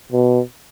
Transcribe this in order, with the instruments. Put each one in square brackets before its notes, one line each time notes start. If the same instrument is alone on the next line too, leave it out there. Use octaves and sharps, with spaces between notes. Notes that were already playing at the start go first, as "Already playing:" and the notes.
[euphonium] B2